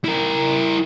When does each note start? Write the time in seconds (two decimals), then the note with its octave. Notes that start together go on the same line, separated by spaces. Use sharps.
0.04 E4 A#4